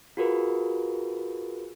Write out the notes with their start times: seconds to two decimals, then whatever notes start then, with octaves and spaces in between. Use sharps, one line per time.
0.17 F4 F#4 G#4 A#4 B4